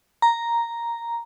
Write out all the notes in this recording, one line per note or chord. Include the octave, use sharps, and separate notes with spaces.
A#5